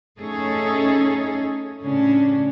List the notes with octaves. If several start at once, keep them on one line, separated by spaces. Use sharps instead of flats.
A3 C#4 D#4 G#4 A4 C#5
A2 C#3 C#4 D4